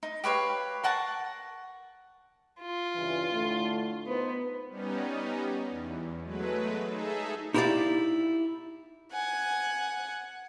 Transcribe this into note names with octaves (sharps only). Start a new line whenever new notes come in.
D#4
G4 B4 C#5 F5
A#4 F#5 A5 C#6
F4
G2 C#3 E3
A2 D3 A3
B3 D#4 A#4 C5
G3 B3 C#4 D#4
E2
F#3 G#3 A3 B4
D#4 G#4 A4 E5
D#4 E4 G4 B4 D5 F5
F#5 G#5